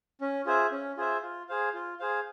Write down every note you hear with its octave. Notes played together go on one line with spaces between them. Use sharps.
C#4
F4 G#4 C5 E5
C#4
F4 G#4 C5 E5
F4
G#4 C5 F5
F4
G#4 C5 F5